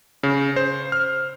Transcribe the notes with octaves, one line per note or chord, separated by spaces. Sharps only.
C#3
C5
F6